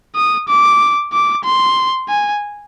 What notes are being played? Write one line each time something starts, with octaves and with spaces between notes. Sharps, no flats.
D#6
D6
D6
C6
G#5